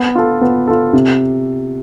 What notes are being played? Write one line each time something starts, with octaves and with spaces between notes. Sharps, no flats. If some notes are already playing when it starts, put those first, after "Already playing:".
Already playing: B3
F4 A4
B3
F4 A4
C3